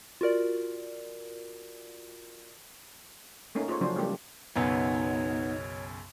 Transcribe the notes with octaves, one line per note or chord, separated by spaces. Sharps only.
F4 F#4 A#4 D5
A3 A#3 C#4 D#4
F4 G#4 C5 C#5
C#3 F3 F#3 C#4 D4 C5
G3 G#3 A#3 G4 A4
B1 F#2 C#3 B3 D#4 C#5